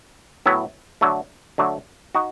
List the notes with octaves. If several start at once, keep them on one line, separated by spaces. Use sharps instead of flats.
A2 F#3 B3 E4
D3 F#3 A3
D3 F#3 A3
D#4 F#4